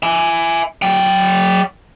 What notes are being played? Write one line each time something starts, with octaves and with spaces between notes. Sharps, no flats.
E5 G#5
F#3 G5